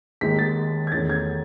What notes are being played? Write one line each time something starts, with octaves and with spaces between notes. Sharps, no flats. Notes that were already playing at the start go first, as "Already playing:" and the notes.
D#2 D#3 G#3 B6
A6
G#6
E2 D#3 A3 C#4 A6
G#6